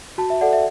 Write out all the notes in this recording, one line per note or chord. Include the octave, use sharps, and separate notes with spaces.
F#4 A5
E5
A4 D5 F#5
E5